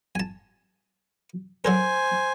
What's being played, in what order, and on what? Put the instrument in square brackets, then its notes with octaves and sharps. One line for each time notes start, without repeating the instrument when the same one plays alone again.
[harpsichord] G#5 A5
[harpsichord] F#3 A4 A#4 [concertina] C5 G#5